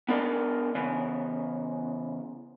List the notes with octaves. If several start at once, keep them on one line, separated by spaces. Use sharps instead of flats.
B3 D4 A#4 D5 D#5
C#3 E3 B3